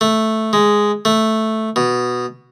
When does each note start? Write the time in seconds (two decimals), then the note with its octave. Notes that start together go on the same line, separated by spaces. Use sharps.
0.01 A3
0.53 G#3
1.05 A3
1.76 B2